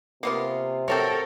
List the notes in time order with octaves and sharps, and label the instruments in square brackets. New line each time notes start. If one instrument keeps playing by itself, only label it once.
[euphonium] C3 [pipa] A#3 B3 F4
[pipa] C4 F#4 C#5 [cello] A4 A#4